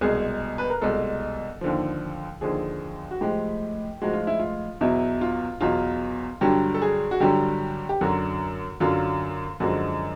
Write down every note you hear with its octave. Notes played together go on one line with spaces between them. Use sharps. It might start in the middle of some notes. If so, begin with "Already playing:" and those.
C2 B2 G#3 G#4
B4
A#4
C2 B2 G#3 A4
D#2 D3 F3
D#2 D3 F3 G#4
F#4
A2 F3 G#3 G4
A2 F3 G#3 F#4
F4
E4
F4
E2 B2 F#3 E4
F4
E2 B2 F#3 F4
G2 D3 F#3 G4
A4
G#4
F#4
G2 D3 F#3 G4
G4
F#2 D3 F#3 F#4
F#2 D3 F#3 F4
F#2 D3 F3 G#3 F#4